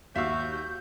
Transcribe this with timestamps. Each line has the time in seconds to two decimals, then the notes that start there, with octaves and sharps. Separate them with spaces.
0.16 D#2 F#4 E5 F5 D6 E6 G6